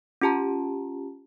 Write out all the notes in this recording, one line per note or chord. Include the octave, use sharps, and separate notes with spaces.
C#4 F4 G4 A5 A#5